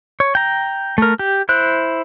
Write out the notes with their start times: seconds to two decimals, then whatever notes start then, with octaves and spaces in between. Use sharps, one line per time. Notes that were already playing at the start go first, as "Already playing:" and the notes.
0.20 C#5
0.35 G5 A#5
0.98 A3 A#4
1.19 G4
1.49 E4 C5 F#6